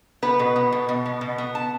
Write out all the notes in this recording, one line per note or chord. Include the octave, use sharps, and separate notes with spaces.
B3 B4
B2
B3
B2
B2
B3
B2
B3
A5